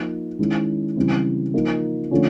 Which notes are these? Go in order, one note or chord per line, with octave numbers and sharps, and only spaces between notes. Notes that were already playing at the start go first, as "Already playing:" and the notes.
Already playing: F3 A#3 D#4
D#3 G#3 C#4 E4
C#3 E3 G3 C4 E4
F3 A#3 D#4
D3 F3 A3 C#4